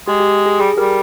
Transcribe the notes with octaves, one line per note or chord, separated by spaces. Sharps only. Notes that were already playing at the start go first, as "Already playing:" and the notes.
G#3 G4
G4
G4
G#4
G3 G#4
G3 G4 A#4